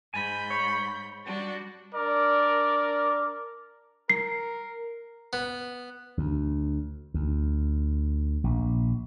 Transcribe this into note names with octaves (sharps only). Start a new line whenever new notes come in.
G#2 G#5 B5 G6
C#5
G3 D4 F#4
D4 A#4 D5 D6
A#4 C7
B3
D2
D2
A#1